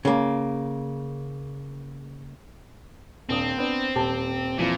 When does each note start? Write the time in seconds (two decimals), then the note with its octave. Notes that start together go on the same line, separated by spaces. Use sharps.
0.05 C#3 A#3
3.29 D#1 C4 D4 D#6
3.58 B3 D4
3.95 D#1 G4 A5
4.58 F2 A#2 E3 F3